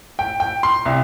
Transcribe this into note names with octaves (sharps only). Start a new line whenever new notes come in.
G5
G5
C6
C2